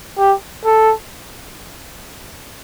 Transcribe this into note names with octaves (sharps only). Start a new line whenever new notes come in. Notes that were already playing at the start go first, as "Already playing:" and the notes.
G4
A4